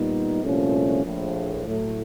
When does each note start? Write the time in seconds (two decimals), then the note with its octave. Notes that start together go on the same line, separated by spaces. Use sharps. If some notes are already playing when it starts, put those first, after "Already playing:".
Already playing: A#2 G3 B3 D#4
0.42 C2 A#2 F3 A3 C#4
1.04 A#1 A2 F3
1.66 A2 F#3 A3